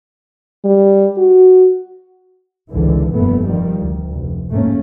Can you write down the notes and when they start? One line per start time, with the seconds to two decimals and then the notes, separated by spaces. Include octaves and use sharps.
0.65 G3
1.18 F#4
2.70 G#1 C#2 G#2 D3 E3
3.13 F1 G2 A#2 A3 B3
3.47 D#3 F3 G3
3.79 D2
4.11 F1
4.50 G#2 A3 A#3 C#4